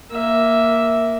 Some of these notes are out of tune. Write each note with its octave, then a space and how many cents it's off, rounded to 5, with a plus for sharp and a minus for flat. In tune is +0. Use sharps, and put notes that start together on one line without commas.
A#3 +0 E5 +0